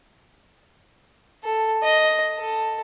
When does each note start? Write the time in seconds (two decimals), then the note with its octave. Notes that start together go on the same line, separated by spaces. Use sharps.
1.44 A4
1.83 D#5
2.38 A4